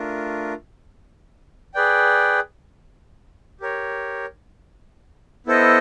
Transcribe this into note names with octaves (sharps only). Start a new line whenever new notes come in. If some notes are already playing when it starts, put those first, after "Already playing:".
Already playing: A3 D4 F4 A#4
G#4 B4 D5 G5
G4 A#4 C#5
B3 E4 A4 C5 D#5